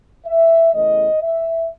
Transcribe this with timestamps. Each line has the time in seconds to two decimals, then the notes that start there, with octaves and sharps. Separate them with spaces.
0.26 E5
0.74 E2 C#3 E3 A3 D#5
1.22 E5